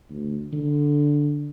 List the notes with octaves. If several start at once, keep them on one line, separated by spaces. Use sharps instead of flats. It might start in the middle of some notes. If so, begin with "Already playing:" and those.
D2
D3